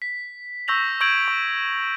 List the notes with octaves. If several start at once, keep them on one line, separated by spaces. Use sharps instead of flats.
B6
C#6 E6 G6 A#6 F7 F#7
C#6 E6 G6 G#6 D7 F#7
C#6